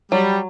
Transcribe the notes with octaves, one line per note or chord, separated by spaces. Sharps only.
F#3 G3